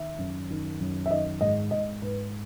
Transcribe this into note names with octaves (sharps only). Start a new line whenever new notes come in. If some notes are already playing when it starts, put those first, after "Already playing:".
Already playing: D#3 E5
F#2
D#3
F#2
E5
D#3 D#5
G#2 D#5
G#2 D#5
G#2 B4